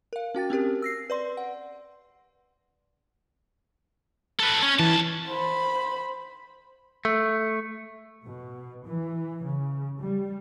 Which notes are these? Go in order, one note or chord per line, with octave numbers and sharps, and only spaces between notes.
A#4 F5
C#4 F#4 G5 A6
C4 C#4 G4 A#4
E6 A#6 C7
B4 D5 C6
F#5
A4 B4
C#4
C2 E3 A5
C5 B5
A3
B2
E3
C#3
G3